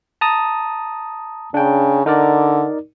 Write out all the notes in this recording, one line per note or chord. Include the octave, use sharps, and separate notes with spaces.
A5 A#5 D#6
C#3 D4 G5
D3 D#4 A#4 D5